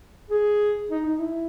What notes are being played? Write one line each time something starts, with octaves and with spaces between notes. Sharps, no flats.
G#4
D#4
D#4
E4